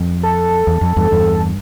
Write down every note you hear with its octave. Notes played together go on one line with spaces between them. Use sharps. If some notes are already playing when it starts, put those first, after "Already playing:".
Already playing: F2
A4
E2
F2
E2 G2
E2 G2